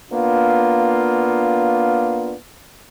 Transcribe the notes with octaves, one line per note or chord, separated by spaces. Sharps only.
A#3 B3 D4 F4